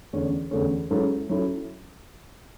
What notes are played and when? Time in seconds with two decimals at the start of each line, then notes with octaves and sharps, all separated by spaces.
0.13 E2 D3 A3 C#4
0.51 E2 D3 A3 C#4
0.91 G#2 F#3 C#4 E4 A4
1.29 F#3 C#4 E4 A4